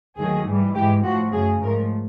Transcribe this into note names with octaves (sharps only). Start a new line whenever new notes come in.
D#2 D#3 F#3 A3 G#4
G#2 E3 G3
G#2 E3 G#3 G4
A2 F3 A3 F#4
F#2 C#3 F#3 A3 G#4
G#2 F3 A3 A#4